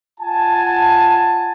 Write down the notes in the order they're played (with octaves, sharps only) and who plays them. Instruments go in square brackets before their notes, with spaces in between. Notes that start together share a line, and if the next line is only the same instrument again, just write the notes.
[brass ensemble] F4 F#5 G#5 A5